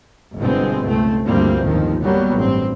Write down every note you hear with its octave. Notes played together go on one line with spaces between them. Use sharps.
G1 G2 B2 G#3 B3 C4
C#2 A3 C4
D2 G2 F3 G3 A#3 C4
G1 D#2 A2 D#3 F3
F#3 G3 A#3 B3
A1 G2 C4